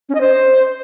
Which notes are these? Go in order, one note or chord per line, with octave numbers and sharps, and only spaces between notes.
C#4
D#5
C5